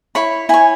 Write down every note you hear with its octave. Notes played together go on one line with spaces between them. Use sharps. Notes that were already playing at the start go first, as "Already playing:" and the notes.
E4 C#5 B5
E4 C#5 G#5